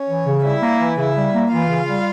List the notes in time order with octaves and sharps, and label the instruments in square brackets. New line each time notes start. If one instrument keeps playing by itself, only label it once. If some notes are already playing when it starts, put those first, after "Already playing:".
Already playing: [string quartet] C#4 C#5
[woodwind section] E3
C#3
[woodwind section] G3 [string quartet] E4 E5
[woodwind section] A#3
E3
[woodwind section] C#3 [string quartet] E4 E5
[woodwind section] G3
A#3
[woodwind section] E3 [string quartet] F4 F5
[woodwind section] C#3
G3